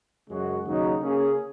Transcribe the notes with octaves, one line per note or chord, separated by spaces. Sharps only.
F#2 C#3 G#3 F#4
D#2 C#3 F#3 D#4 F#4
C#3 A#3 C#4 G#4